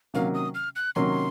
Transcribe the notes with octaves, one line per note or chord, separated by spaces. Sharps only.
C3 D#3 F#3 A#3 C#4 F5
D#6
F6
F#6
C3 D#3 F#3 A#3 C#4 C6